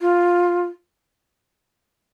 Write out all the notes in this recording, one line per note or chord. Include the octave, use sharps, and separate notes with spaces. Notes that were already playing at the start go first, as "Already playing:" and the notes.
F4